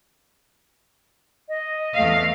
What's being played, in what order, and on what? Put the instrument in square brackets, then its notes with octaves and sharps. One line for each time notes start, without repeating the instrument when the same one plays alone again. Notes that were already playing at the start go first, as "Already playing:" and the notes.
[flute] D#5
[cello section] E2 A3 F5